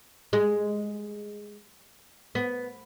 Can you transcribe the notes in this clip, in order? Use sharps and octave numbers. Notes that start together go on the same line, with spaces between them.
G#3
B3